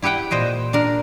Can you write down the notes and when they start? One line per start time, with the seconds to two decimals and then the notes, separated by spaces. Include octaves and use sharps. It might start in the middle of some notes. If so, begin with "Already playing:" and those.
0.02 E4 G4 B4 F#5 G5
0.31 A#2 C5 D#5 G5
0.73 D4 A#4